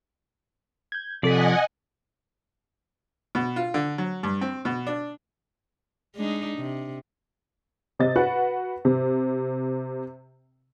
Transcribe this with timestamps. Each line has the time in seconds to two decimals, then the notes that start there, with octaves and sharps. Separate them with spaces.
0.92 G6 G#6
1.23 C3 F3 A4 D5 D#5 F#5 G#5 B6
3.35 B2
3.56 F4
3.74 D3
3.98 F#3
4.23 G2
4.41 C4
4.65 B2
4.87 D4
6.15 G#3 D4 D#4
6.58 C3
7.99 C3 D#5 A6
8.16 F#4 B4 F#5
8.85 C3